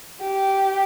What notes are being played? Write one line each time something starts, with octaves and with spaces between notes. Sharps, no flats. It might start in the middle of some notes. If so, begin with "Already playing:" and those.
G4